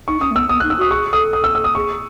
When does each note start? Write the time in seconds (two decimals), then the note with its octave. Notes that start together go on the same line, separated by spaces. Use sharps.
0.08 D#4 C#6
0.20 C#4 D#6
0.31 A3
0.35 B3 E6
0.49 B3 D#6
0.60 F#6
0.63 D#4
0.70 E6
0.78 F#4 D#6
0.91 G#4 C#6
1.12 A4 D#6
1.33 D#6
1.44 E6
1.55 E6
1.64 D#6
1.75 G#4 C#6